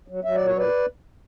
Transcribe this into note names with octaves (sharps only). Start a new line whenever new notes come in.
F#3
F#3 E5
D5
A#2
C#5
A#2 B4 D5